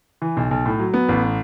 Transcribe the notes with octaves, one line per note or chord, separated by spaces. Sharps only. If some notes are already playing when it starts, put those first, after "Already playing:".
E3
B1
B1
A2
F#3
B3
A1